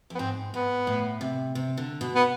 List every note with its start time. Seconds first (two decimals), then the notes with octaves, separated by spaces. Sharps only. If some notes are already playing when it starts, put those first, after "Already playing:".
0.10 F2
0.15 B3
0.19 G#2 C4
0.54 G#2 B3
0.87 A2
1.21 C3
1.55 C3
1.77 D3
2.01 B2
2.15 B3